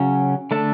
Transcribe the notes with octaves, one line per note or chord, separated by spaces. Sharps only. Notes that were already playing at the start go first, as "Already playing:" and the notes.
Already playing: C#3 F#3 C#4
D3 A3 D4 A4 E5